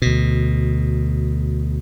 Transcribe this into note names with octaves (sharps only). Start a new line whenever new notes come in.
D2 B2